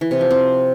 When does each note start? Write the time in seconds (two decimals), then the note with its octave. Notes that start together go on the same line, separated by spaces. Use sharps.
0.01 E3
0.11 C3
0.21 F3
0.31 C4